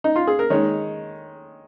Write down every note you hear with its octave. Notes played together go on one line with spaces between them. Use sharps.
D#4
F4
G#4
A#4
D#3 G#3 C#5